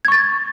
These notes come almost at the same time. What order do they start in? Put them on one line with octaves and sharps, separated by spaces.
G#6 C#6 A6